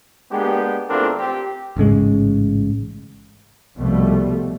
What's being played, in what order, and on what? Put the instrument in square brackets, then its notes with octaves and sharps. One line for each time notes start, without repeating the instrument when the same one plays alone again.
[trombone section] G#3 A#3 B3 D4 G4
E2 A3 C4 D4 F4 A#4
C4 G4
[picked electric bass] A1 G#2 C#3 G#3
[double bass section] C2 B2 F3 G3 A3